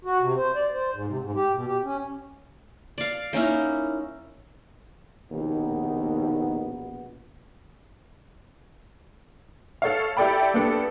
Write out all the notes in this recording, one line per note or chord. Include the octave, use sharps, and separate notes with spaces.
F#4
C3
C5
D5
C5
G#2
C3
G#2
G4
B2
G4
C#4
D5 F5
A#3 C#4 D#4 E4
A#1 D#2 B2 B3 D#4
A4 C#5 F5
E4 G4 A4 D5 G5 B5
A#3 B3 D4 G4 A4